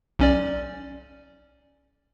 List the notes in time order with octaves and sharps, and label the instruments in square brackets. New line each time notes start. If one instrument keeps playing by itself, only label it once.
[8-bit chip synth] B1 C#4 D5